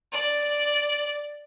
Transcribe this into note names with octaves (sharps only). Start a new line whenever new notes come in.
D5